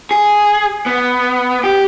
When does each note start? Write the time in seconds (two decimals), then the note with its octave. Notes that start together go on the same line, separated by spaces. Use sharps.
0.11 G#4
0.86 B3
1.64 G4